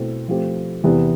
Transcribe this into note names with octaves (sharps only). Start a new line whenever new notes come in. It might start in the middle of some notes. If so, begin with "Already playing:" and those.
Already playing: B2 A3 C4 E4 A4
F3 A3 C4 G4
E2 C3 E3 B3